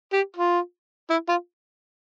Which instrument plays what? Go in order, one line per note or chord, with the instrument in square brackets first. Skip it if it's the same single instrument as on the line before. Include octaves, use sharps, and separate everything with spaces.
[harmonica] G4
F4
E4
F4